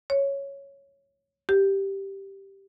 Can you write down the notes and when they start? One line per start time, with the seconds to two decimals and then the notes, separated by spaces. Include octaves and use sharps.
0.10 C#5
1.49 G4